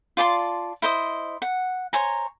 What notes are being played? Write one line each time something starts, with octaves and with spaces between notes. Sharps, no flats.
F4 D5 A5 C6
E4 C5 D#5
F#5
C5 C#5 G#5 A#5